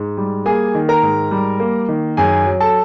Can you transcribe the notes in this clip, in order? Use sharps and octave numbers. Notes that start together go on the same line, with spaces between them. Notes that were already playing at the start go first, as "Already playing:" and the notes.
Already playing: G#2
G3
A#3 G#4 G#5
D#3
A#4 A#5
G#2
G3
A#3
D#3
F#2 G#4 G#5
F#3
A4 A5